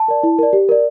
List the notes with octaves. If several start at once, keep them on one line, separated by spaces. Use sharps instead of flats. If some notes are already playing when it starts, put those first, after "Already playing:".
Already playing: A5
A#4 D5
E4
A#4 D5
G4
A#4 D5